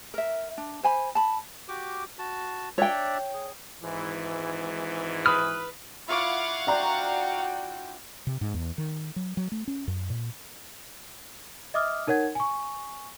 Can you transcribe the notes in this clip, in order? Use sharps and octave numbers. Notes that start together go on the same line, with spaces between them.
A#4 E5
D4
C5 G#5 B5
A5 B5
F#4 G4 D6
F#4 A5
D4 C#5 D5 E5 G5
G#4
G#1 G#2 E3
B4 B5 D#6 F6
E4 F4 C#5 F5 F#5 B5 C#6 D6
D4 F#4 C5 D5 G5 A#5
C3
G#2
E2
D#3
F#3
F#3
A3
C#4
F#2
A#2
D#5 E5 D6 D#6 F6
D#4 A#4 C#5 F#5 G#6
G#5 C#6